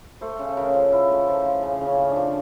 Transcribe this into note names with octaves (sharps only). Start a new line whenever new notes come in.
A3 C5
C#3
C#3 A#4
F3
F3 E4
A3
F3
F3
C#3
C#3
C#4
C#3
D4
F3